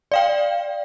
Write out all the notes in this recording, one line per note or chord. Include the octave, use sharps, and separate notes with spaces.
D5 F5 G5